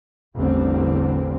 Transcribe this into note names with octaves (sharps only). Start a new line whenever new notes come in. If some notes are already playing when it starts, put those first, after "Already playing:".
A1 E2 D3 G3 C4